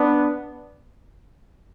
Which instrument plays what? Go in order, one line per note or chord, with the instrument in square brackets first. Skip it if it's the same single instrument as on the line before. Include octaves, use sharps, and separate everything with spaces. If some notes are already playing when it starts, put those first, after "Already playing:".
Already playing: [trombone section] B3 D4